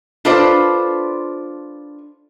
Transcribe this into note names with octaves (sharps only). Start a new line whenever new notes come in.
D4 F4 A4 B4 C5 D5